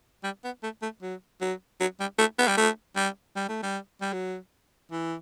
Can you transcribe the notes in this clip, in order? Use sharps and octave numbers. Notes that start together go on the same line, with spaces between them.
G3
B3
A3
A3
F#3
F#3
F#3
G3
A3
B3
G3
A3
G3
G3
A3
G3
G3
F#3
E3